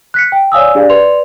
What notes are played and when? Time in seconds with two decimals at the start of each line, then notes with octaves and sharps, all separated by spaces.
0.14 F#6 B6 C#7
0.32 G5
0.52 C#5 D5 F5 G#5 D#6 E6
0.75 D4 G4 G#4 D5 F5
0.90 B4 D5 C6 F7